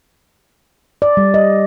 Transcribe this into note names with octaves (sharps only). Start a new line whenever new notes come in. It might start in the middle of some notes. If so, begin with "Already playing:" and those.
D5
G3
D#5